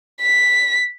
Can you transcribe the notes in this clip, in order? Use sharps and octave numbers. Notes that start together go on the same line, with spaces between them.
B6